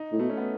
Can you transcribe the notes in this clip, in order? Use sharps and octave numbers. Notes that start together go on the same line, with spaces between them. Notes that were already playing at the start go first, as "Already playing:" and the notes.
Already playing: D#4
A2
B2 A3
C#4
B3